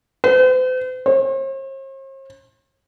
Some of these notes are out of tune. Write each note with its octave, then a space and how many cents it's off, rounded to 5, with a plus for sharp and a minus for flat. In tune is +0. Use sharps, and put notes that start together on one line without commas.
C5 -45
C5 +45